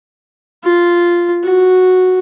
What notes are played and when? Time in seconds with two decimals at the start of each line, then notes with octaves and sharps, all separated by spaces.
0.64 F4
1.44 F#4